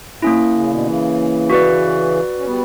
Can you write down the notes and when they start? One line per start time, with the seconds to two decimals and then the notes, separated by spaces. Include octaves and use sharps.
0.16 G2
0.22 A#2 A#3 C#4 E4
0.55 C#3
0.70 B2 D3
0.86 C#3 E3
1.50 F#4 B4 D5
2.39 C#4
2.46 G3 B3